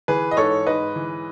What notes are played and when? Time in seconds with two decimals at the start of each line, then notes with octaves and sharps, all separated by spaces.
0.08 E3 G#4 B4
0.31 D#5
0.37 G#2 A4 C#5
0.66 G#2 B4 D#5
0.96 E3